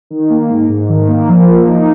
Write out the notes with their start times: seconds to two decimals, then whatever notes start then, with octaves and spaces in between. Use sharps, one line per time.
0.10 D#3
0.30 A#3
0.50 G#2
0.69 G#2
0.89 D#3
1.08 A#3
1.29 F3
1.48 A#3
1.68 D#4